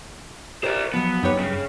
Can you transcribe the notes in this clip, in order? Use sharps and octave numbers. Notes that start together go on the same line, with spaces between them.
F4 G4 A#4 C5 D5
F3 F#3 B3
F#2 D#4 G4 B4 C#5
G2 C#3